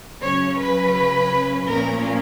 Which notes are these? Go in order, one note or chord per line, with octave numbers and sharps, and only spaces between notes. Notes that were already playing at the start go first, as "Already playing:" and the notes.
C#3 F#3 C#4 C#5
B4
A#2 F3 A#3 C#4 A#4